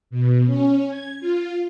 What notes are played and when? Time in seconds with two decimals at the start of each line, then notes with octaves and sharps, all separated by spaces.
0.10 B2
0.46 C#4
0.87 G#6
1.20 F4